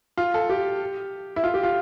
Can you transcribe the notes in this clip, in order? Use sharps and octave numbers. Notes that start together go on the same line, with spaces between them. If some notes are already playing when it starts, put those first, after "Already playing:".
F4
A4
G4
E4
F4
G4
F4